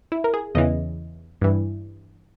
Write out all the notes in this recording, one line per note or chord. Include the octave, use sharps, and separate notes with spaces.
E4
A#4
G#4
E2 C#3 E3 D#5
G2 E3